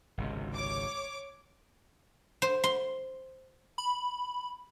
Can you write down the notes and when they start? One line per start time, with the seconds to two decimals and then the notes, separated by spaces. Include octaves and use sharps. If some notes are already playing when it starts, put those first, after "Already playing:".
0.18 G#1 C#2 C3
0.54 C#5 D6
2.42 C5
2.64 C6
3.78 B5